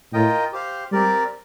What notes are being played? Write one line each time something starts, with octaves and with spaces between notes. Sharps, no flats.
A2 F4 A#4 D#5 G5
G4 C5 F5
G3 C4 G4 A#4 D5